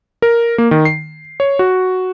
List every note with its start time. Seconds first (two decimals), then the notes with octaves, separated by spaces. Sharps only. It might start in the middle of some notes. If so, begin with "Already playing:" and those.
0.22 A#4
0.58 A#3
0.71 D#3
0.85 C7
1.40 C#5
1.59 F#4